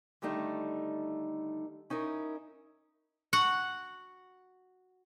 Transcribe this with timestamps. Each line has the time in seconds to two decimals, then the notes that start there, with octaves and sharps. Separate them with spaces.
0.22 D3 D#3 G3 A3 D#4
1.90 C#4 D#4 E4 A#4
3.33 F#4 F#5